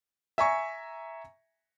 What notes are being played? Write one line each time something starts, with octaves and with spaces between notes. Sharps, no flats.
E5 G#5 A#5 C#6